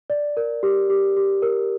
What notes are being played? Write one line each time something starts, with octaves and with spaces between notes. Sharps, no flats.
D5
A#4
G4
G4
G4
A#4